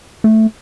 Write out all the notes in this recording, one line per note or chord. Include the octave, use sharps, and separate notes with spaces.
A3